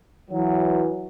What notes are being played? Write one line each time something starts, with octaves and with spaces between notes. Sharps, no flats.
E3 F#3